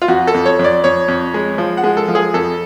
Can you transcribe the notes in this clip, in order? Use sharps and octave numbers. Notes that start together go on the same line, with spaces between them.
F4
F2 F#4
A4
F2
C#5
F2
D5
F2 C#5
F2
G#3
F3
F#5
G#3
A4
F3
G#4
F2 A4